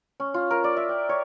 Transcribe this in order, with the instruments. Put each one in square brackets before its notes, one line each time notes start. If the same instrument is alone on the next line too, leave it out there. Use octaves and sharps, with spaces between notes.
[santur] C#4
F4
A#4
D5
E5
G5
C#5